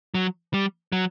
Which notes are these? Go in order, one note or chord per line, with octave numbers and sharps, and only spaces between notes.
F#3
G3
F#3